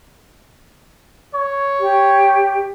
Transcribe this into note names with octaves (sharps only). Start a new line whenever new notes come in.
C#5
G4